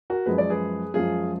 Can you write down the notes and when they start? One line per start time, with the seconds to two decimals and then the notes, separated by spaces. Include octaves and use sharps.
0.10 F#4 A#4
0.26 F#2 F3 G#3 B4
0.38 D5
0.50 G#4 B4
0.94 F#2 F3 G#3 F4 G#4